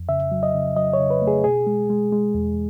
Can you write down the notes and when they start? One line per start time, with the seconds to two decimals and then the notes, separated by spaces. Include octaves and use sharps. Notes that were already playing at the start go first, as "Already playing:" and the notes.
Already playing: F2
0.09 C#3 E5
0.32 F#3
0.43 D#5
0.54 C#3
0.76 F#3 D#5
0.93 C#5
0.99 C#3
1.10 B4
1.22 A3
1.27 G#4
1.44 B2 G#4
1.67 G#3
1.90 G#3
2.12 G#3
2.35 E2